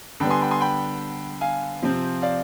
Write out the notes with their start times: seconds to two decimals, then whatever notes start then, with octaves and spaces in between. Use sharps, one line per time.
0.20 D3 G3 B3 G5 B5
0.31 G#5 C6
0.41 G5 B5
0.51 G#5 C6
0.61 G5 B5
1.41 F5 G#5
1.83 C3 F3 C4
2.22 D5 F5